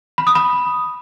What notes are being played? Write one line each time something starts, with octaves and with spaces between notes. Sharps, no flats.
B5
D#6
B5